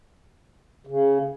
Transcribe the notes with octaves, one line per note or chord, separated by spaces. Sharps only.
C#3